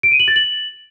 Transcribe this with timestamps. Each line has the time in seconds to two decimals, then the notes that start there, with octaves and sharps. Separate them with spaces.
0.03 D7
0.11 D#7
0.20 F#7
0.28 A6
0.36 F#7